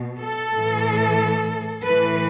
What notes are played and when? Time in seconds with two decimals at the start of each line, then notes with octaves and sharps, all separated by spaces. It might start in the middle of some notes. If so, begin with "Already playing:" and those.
Already playing: B2
0.20 A4
0.53 A2 E3
1.84 A2 E3 B4